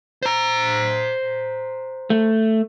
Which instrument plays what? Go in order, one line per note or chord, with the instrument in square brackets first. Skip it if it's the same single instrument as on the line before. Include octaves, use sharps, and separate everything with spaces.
[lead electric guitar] C5 A#5
[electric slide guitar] A3